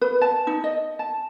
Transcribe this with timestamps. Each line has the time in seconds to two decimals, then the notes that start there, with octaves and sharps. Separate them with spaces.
0.01 B4
0.22 A5
0.47 D#4
0.64 D#5
0.99 A5